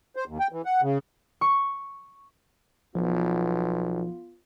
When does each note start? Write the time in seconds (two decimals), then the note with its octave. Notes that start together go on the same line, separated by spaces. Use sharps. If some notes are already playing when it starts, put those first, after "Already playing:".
0.16 C5
0.28 D#2
0.40 G5
0.52 E3
0.65 F#5
0.82 C#3
1.41 C#6
2.95 B1 F3 B3 F4